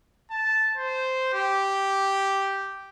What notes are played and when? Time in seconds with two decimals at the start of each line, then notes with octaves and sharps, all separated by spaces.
0.31 A5
0.77 C5
1.34 G4